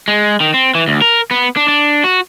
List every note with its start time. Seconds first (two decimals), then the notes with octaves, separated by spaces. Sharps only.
0.08 G#3
0.40 D#3
0.54 C4
0.75 E3
0.88 D2
1.02 A#4
1.31 B3
1.57 D4
1.68 D4
2.04 F#4